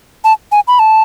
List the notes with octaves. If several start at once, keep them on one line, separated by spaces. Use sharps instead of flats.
A5
G#5
B5
A5